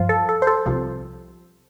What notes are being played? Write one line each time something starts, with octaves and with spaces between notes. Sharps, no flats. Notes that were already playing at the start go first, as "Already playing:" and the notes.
Already playing: G2 F3 F4
A4
A4
C5
A4
C2 C3 F3